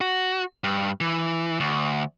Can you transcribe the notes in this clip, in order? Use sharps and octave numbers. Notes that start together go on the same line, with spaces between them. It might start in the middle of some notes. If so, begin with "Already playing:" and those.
F#4
G2
E3
D2